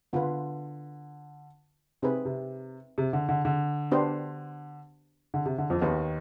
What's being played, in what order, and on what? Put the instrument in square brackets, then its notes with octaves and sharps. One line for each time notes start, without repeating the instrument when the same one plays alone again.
[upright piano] D3 [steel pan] B3 F4 B4
[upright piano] C3 [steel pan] C4 D#4 G#4 B4
[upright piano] C3
C3
D3
D3
D3
[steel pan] B3 D4 G4 C5
[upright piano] D3
C3
D3
F2 F3
[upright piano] D#2 D#3 [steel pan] B3 D#4 B4